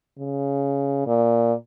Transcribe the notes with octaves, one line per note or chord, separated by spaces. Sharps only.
C#3
A#2